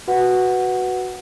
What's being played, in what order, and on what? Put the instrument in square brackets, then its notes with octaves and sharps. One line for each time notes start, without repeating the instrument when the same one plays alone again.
[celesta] F#4 B4 F#5